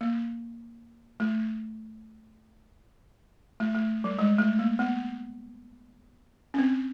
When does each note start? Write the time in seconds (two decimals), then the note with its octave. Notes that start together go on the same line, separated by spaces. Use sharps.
0.01 A#3
1.20 A3
3.60 A3
3.75 A3
4.04 G3
4.19 G#3
4.39 A3
4.59 A#3
4.79 B3
6.54 C#4
6.58 C4